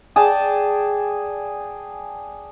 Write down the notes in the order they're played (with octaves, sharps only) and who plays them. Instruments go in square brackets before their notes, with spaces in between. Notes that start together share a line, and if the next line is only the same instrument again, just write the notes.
[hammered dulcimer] G#4 D5 G5 A5